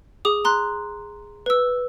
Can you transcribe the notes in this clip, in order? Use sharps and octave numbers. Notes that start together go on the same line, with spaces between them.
G#4 D6 D#6
A#5 C6 F#6
B4 E6